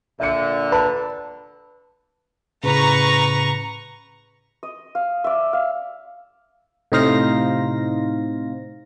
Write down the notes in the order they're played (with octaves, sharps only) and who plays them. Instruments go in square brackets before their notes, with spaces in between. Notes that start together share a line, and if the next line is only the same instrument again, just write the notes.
[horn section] A#2 D3 [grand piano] E5 C#7
[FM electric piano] B4 [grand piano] A5
[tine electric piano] A2 C#3 [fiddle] B4 [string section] A#5 C#6
[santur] D#5
F5
D5 E5
F5
[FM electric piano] A2 C3 D#4 C5 F5 A#6